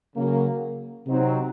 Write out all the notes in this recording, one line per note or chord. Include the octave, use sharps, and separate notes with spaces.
C#3 F#3 A#3
C3 F#3 C4 D#4